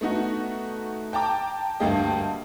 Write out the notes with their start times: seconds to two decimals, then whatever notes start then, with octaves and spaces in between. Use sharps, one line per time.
0.01 A3 B3 D#4 F#4
1.13 G5 A5 A#5 D6
1.80 D2 G2 A#3 G4 D#5